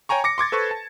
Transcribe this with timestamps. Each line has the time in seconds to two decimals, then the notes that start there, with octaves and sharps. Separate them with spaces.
0.09 C#5 G5 G#5 A#5 C#6
0.24 D6 A#6 C#7
0.38 C6 D6 G#6 A6
0.52 A4 B4 C5 C#6
0.71 A5